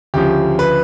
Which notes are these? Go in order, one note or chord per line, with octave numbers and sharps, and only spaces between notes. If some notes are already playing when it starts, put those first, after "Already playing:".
D2 C#3 F3 G4
B4